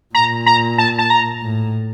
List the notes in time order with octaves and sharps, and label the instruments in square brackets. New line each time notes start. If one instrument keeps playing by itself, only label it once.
[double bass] A#2 [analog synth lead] A#5
[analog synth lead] A#5
A5
A5
A#5
[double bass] A2